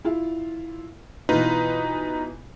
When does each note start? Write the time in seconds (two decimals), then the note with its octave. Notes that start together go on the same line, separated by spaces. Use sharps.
0.05 E4 F4
1.29 B2 E3 D#4 F4 B4